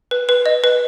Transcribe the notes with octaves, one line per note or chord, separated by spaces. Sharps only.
B4
B4
D#5
B4